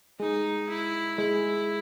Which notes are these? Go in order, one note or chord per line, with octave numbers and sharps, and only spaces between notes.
G#3 D#4 G#4
E4
G#3 E4 G#4